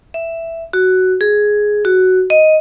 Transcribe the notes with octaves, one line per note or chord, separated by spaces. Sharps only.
E5
F#4
G#4
F#4
D#5